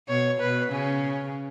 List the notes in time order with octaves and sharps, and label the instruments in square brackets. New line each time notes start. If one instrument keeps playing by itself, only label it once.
[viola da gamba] B2 [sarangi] C#5
[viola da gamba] B2 [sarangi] B4
[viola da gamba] C#3 [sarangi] C#4